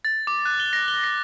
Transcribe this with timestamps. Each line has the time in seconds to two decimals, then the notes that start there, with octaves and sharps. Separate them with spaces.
0.05 A6
0.27 D6
0.45 F#6
0.60 G7
0.73 A#6
0.88 G7
1.04 A#6